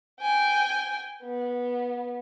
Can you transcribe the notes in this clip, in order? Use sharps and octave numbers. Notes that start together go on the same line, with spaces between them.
G5 G#5
B3